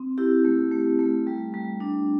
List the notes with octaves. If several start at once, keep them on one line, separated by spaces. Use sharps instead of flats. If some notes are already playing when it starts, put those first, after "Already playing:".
Already playing: C4
E4 G4
A3
A3
A3
G3
G3
D4